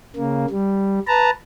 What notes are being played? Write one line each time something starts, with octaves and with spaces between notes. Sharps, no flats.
C#3 A#3
G3
B4 A5 A#5